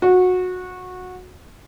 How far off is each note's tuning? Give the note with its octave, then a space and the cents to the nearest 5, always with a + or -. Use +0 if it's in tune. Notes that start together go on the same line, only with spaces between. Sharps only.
F#4 -20